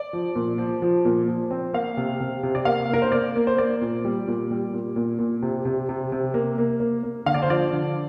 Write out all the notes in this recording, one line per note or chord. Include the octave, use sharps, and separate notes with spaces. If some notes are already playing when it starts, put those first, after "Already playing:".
Already playing: D5
F3
A#2
F3
F3
A#2
F3
C4
A#3 F5
C3
C3
C3
D5
A#3 F5
A#3 A#4
C5
A#3 D5
A#3
C5
A#3 D5
A#2
G3
A#2
G3
A#2
A#2
A#2
C3
C3
C3
C3
A#3
A#3
A#3
A#3
D3 F5
D5
C5
F3 D5
D3